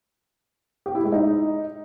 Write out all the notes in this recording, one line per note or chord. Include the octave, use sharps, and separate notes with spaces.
G4
E4
G#3
D#4